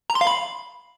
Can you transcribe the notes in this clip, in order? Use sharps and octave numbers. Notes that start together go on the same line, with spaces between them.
A#5
C6
F5
B5